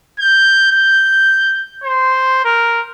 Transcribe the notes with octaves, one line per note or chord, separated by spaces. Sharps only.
G6
G6
C5
A#4